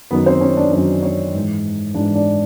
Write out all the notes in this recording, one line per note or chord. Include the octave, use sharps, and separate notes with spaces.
F#2 D#3 B3 B4
C4 C5
C#4 C#5
D4 D5
F#2 D#3 D4 D5
C#4 C#5
G#2 E3
G#2 E3 D4 D5
D4 D5